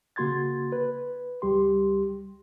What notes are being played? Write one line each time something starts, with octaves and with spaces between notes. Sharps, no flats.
C#3 A#3 F#4 C6 G#6 A6
B4
C#2 G3 G4 C6